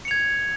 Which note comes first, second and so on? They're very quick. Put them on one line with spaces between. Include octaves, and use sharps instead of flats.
C#7 F7 G#6